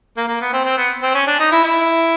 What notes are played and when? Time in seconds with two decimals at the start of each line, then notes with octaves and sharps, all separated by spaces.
0.17 A#3
0.28 A#3
0.41 B3
0.53 C4
0.65 C4
0.77 B3
1.03 C4
1.14 C#4
1.27 D4
1.40 D#4
1.52 E4
1.64 E4